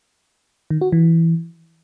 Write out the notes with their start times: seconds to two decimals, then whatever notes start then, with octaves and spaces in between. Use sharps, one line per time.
0.70 D#3
0.81 F#4
0.92 E3